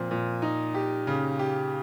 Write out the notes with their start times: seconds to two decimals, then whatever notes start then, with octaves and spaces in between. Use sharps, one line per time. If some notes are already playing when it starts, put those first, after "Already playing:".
Already playing: A#2 F3 C4
0.11 A#2
0.42 D#4
0.74 G4
1.07 C#3
1.39 G4